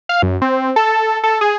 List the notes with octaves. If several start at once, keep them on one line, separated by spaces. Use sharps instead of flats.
F5
F#2
C4
A4
A4
G#4